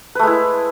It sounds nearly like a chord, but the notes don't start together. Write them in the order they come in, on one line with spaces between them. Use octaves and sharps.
B4 A3 G#3 E4